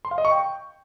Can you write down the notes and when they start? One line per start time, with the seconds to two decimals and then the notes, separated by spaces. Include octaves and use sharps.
0.05 C6
0.11 F5
0.18 D#5
0.25 C#6
0.31 G5